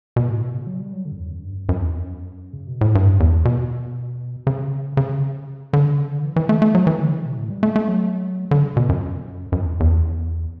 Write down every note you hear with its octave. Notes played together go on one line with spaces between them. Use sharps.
B2
A2
B2
C#3
F#3
G3
F#3
D3
F#2
E2
F#2
G2
F#2
F#2
E2
F#2
C#3
B2
A2
G2
E2
B2
C#3
C#3
D3
C#3
D3
E3
E3
A3
A3
F#3
E3
D3
C#3
B2
A2
G3
A3
A3
F#3
D3
C#3
B2
F#2
F#2
E2
E2